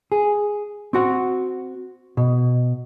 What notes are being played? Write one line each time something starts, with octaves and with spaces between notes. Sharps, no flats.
G#4
C4 F#4 F#5
B2